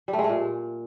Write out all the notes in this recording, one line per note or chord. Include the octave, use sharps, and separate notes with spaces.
G3
A3
G#3
A3
A#2